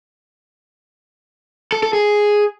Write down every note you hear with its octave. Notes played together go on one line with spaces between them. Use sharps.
A4
A4
G#4